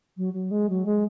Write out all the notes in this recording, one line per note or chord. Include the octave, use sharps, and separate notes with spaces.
F#3
F#3
G#3
F#3
G#3